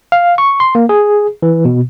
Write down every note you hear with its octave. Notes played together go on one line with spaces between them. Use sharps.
F5
C#6
C6
A#3
G#4
E3
B2